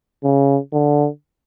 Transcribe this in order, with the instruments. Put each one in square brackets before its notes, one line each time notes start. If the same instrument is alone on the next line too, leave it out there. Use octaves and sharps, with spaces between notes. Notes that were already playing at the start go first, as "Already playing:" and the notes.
[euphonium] C#3
D3